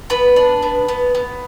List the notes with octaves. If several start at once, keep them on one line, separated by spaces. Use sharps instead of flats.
B3 B4
D4
B3
B3
B3